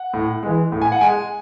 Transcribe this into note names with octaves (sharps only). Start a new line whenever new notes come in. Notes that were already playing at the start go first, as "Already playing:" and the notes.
Already playing: F#5
A2
E3 G#3
A2
G#5
F#5
G#3 G#5